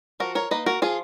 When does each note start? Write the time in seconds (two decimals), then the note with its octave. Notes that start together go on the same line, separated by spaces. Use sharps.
0.20 F3 F#4 A#4
0.35 A#4 C#5
0.51 A#3 D#4 B4 D#5
0.66 F#4 A#4
0.82 F3 F4 G#4